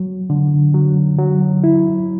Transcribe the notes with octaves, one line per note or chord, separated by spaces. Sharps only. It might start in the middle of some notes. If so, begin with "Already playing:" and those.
Already playing: F#3
D3
F#3
F#3
E4